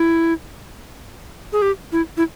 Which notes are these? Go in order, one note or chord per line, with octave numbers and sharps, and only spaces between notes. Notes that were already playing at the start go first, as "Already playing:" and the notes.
Already playing: E4
G#4
G4
E4
E4